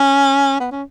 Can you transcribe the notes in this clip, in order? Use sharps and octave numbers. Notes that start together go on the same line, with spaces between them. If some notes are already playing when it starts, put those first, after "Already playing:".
Already playing: C#4
B3
C#4